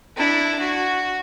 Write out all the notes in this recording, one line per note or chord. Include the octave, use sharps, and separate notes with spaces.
D4 E4
F#4